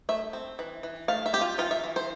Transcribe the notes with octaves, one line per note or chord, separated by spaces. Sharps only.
A3 E5
C4
E3
E3
A3 F5
E5
C4 G4
F4
E3 F4
E5
E3
C5